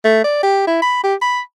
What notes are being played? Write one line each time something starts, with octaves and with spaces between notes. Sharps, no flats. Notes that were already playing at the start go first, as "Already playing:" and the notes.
A3
D5
G4
E4
B5
G4
B5